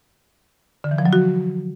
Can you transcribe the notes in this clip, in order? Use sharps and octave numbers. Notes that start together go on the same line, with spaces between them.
D3
E3
F3
F#3
F#4